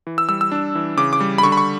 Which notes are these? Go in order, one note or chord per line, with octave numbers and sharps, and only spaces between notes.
E3
E6
G3 E6
E6
D4
E3
C#3 D6
D6
G3
B5
D3 C#6
B5
C#6